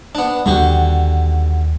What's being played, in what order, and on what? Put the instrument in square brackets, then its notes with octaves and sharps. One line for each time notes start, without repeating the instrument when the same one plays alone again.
[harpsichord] B3 D4
[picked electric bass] D#2 G3 [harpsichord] D3 F#4 G4